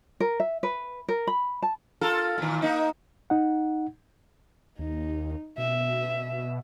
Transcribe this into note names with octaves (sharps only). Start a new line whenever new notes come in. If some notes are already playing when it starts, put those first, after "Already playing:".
A#4
E5
B4
A#4
B5
A5
F4 A4 A#4
A#2 D#3
A#3 D#4
D#4 F#5
D#2 D#4
B2 E5